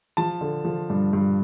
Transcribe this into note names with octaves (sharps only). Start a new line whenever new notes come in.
F3 A5
D3
F3
G2
G2